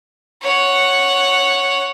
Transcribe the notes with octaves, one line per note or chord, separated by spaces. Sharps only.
C#5 F#5